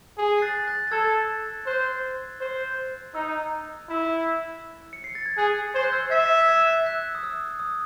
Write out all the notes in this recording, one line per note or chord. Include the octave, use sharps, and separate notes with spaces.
G#4
C7
F#6 A6
F#6 A6
A6
A4 E6 G#6
C5 F#6
C5
D#4 E6
E4
C#7
C7
A6
G#6
G#4 F#6
C5 G#6
F#6
E6 G#6
E5 G#6 C7
E6 G#6
E6
F#6
F#6
D#6
E6
D#6